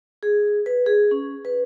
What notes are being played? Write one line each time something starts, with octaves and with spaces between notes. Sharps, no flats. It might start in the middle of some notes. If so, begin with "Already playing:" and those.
G#4
B4
G#4
C#4
B4